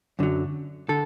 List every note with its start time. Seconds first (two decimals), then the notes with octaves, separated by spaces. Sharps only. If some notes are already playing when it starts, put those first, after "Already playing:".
0.19 F#2 D3 F#3
0.89 D3 A4